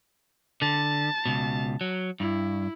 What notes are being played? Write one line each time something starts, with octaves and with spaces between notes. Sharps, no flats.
D3 A5
C#2 B2
F#3
G2 E4